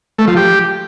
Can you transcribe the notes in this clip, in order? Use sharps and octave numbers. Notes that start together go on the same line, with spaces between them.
A3
F3
G4